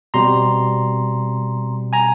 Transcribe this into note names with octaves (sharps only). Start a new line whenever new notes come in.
B2 G3 C4 A#5 C6
G#5 A#5